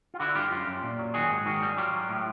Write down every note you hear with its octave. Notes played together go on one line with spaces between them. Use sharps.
F4
D3 E4 F#4
G2 F4 G4
F#2 F4 G4
F#2
A#2
F#3
D#3 F#4 G#4
G#2
D#3 F#4 G#4
G3
F#3 F4 G4
F#3
A2